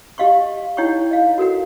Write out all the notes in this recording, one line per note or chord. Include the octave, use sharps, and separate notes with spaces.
G4 D#5 F5 C6 C#6
D#4 E4 C#5 F#5 G5 C#6
D#5 F5
F#4 A4 A#4 F#5